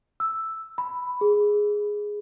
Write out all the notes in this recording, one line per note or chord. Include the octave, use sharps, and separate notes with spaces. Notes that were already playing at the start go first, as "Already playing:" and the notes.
E6
B5
G#4